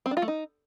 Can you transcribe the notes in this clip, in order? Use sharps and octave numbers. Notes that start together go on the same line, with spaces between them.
C4
D4
F4
A3
D#4